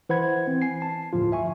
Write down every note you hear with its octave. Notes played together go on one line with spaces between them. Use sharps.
E3 C5 F#5 B5 G#6
C4
G#5 C7
A5
G1 D#2 A2 F3 F4
E5 G#5 C#6